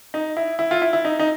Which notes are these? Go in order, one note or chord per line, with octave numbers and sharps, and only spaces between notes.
D#4
E4
E4
F4
E4
E4
D#4
D#4